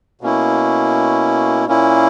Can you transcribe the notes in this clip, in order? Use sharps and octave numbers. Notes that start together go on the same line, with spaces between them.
B2 A#3 C#4 E4
A#2 A#3 C#4 E4